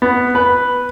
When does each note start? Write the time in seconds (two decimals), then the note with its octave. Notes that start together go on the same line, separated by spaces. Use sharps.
0.02 B3
0.35 B4